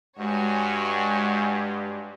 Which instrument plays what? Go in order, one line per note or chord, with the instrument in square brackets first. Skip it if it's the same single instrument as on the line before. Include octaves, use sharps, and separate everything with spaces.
[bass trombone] G2 [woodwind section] G#3 [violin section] F#4 C#5 G#5